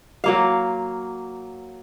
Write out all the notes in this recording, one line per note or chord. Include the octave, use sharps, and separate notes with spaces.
F#3 A#3 F5